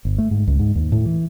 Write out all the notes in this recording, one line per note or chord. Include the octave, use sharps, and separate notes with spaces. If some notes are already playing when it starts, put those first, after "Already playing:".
G1
A3
G#2
C#2
G#2
D#2
A2
E3